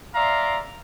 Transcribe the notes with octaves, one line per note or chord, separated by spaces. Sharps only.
D5 E5 F5 A#5 C6